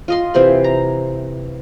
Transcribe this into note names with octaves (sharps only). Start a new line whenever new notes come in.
F4 D#5 C6
C3 E3 C5 B5
A#5